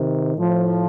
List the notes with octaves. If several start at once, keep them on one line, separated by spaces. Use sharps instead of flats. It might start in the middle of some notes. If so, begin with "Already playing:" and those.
Already playing: C3 D#3
A2 F3